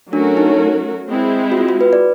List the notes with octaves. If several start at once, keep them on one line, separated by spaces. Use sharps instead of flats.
F#3 A3 C#4 D4 F#4 A#4
D#4
G#3 C4 E4
F#4
F4
F#4
B4
D5